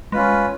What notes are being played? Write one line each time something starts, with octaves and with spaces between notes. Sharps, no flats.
G#3 C#4 F4 B4